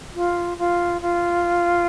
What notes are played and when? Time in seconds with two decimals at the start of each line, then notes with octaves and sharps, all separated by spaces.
0.14 F4
0.58 F4
1.01 F4